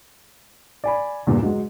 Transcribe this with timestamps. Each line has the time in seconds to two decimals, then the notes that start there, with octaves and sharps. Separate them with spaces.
0.84 D5 G#5 B5
1.27 E2 G2 A#2
1.43 F#3 G#3